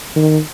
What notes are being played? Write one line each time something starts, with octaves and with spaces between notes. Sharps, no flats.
D#3